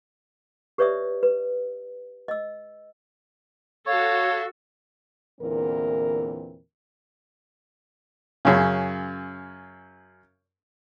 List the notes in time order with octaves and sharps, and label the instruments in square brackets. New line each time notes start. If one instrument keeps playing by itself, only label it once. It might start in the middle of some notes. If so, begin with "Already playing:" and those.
[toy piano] G4 B4 C#5 D5 E5 D#6
B4
D#5 E6
[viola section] F#4 A4 [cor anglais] C#5 [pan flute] F5
[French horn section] E2 A#2 D3 E3 C4 A#4
[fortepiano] F#2 C#3